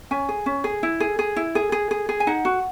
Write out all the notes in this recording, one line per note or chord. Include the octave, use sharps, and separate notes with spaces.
C#4 G#5
G#4
C#4
G#4
E4
G#4
G#4
E4
G#4
G#4
G#4
G#4
G#5
D#4 F#5
F#4